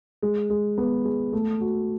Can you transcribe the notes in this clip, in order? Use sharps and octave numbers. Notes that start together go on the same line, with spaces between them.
G#3
G#3
B3
G#3
A3
F#4